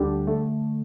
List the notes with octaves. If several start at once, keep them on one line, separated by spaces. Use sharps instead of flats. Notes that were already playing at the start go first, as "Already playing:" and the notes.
Already playing: D2 D3 G3 D4 G4
D3 A3